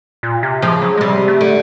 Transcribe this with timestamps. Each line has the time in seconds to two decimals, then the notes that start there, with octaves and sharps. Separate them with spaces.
0.23 A#2
0.43 C3
0.62 C#3 F3
0.82 F#3
0.97 G#3
1.01 C3 G3
1.28 A3
1.41 D3